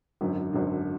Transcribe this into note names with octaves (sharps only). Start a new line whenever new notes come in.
G#1 F#2 D3
G#1 F#2 D3